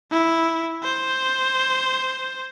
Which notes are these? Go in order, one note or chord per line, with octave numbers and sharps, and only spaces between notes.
E4
C5